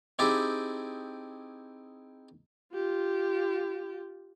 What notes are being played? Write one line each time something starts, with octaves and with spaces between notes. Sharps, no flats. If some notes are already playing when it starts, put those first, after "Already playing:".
C4 D#4 E4 G4 G#4 A5
F4 G4